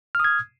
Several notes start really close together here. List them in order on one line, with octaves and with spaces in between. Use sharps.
F6 D#6 G#6